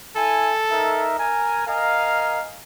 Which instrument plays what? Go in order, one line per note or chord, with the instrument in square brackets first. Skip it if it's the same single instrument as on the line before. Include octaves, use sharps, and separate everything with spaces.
[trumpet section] E4 G#5 [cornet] A4
[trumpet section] D#4 A#4 E5
A#4 G#5
[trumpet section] A#4 D#5 G#5 [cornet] F5